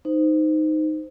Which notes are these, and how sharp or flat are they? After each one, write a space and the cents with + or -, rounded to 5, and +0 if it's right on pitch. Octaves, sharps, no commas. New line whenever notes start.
D#4 +0 C5 -20